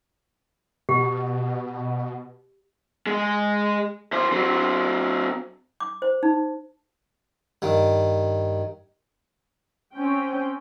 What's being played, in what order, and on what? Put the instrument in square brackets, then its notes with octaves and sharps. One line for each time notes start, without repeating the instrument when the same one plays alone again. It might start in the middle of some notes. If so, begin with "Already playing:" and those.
[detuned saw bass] B2 [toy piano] G4
[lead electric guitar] G#3 G#4
E3 C5
F#3 C4
[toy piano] D6
C5
D#4
[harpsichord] G2 D#3
[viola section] C4 C#4 G5